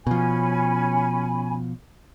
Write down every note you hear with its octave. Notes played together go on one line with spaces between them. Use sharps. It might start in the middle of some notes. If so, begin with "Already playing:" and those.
B2 F3 C#4 G#5 B5